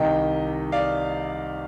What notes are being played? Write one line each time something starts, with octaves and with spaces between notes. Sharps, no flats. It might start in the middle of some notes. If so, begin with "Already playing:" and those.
Already playing: C2 C3 D#3 D#5 G5
D5 F5